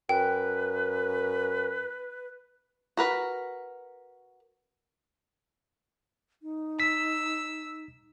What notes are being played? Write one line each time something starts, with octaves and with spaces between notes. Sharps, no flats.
F#2 B4 G5
F#4 A#4 B4
D#4
E6 B6